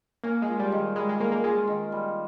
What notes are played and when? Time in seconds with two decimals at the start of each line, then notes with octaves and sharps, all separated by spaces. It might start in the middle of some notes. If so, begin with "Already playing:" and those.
0.24 A#3 C#4
0.42 G#3
0.48 F4
0.60 G3
0.72 D#3
0.96 G3 G#3
1.09 G#3
1.20 A#3 C#4
1.31 A#3
1.44 G#3 F4
1.67 D#3
1.92 G3